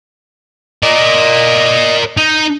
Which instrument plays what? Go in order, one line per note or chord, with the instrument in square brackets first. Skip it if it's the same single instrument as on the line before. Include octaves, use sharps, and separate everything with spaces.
[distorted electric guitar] A#4 D5 [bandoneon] D#5
[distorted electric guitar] D#4